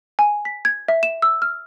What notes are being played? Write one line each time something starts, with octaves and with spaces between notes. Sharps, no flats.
G#5
B6
G#6
E5
E7
E6
F6